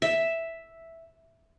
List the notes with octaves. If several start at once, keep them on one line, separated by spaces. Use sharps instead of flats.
E5